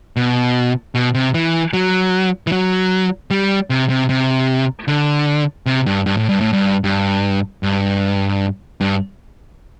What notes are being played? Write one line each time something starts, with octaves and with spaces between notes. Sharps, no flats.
B2
B2
C3
E3
F#3
E3
F#3
G3
C3
C3
C3
D3
C3
G2
G2
A2
G2
A2
G2
G2
G2
G2